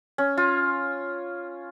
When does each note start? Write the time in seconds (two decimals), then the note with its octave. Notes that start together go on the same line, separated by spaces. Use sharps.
0.18 C#4
0.38 F4